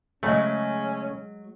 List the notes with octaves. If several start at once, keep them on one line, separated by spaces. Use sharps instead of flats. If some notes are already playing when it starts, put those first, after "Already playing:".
C#3 F#3 G#3 A3 C#4